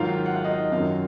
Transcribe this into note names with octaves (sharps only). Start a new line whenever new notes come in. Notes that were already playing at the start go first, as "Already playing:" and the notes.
Already playing: G#2 D#3 F#3 F4 F5
F#5
F5
D#4 D#5
F#2 D#3 F#3 F4 F5